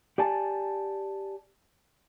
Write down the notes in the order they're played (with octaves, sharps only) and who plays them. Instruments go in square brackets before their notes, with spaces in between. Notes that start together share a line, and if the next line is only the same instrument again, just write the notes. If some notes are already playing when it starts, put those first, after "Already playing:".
[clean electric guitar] G4 D5 G#5 A5